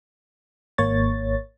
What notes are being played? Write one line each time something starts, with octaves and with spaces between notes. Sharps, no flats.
G#1 A#3 C#5 A6